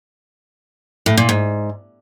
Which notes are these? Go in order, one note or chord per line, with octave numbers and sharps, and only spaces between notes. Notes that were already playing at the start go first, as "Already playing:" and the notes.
A2
A#2
G#2